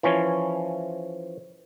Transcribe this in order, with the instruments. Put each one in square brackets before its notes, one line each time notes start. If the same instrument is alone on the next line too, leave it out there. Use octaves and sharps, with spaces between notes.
[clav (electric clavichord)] E3 F3 C#4 C#5